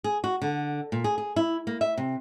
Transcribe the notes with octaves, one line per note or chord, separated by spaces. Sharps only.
G#4
F#4
D3
A#2
G#4
G#4
E4
A#3
E5
C3